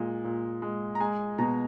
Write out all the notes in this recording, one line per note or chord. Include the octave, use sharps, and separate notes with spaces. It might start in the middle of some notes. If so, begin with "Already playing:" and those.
Already playing: A#2 G#3
A#2
G#3
A#5
G#3 G#5
B2 A#5